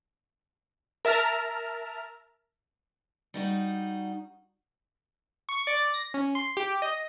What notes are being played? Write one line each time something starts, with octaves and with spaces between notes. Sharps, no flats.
A#4 E5 A5 A#5 F6
G3 D#4 F#4
C#6
D5
A#6
C#4
C6
G4
D#5